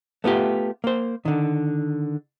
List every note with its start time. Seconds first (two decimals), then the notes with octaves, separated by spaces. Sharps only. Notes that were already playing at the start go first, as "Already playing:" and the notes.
0.24 A3 B3 F4 G4
0.84 A#3 C5
1.25 D3 D#3